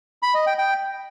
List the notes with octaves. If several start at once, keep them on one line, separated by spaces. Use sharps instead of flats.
B5
D#5
G5
G5